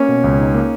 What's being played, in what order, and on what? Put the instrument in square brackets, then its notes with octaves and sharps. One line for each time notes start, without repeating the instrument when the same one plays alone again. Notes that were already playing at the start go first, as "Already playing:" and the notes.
Already playing: [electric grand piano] A#3 [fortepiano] C#4
[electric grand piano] B2
C#2
D#4
A#3